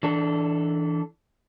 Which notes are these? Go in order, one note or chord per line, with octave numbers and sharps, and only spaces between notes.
E3 D4 A4